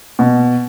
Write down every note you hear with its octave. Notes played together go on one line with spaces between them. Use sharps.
B2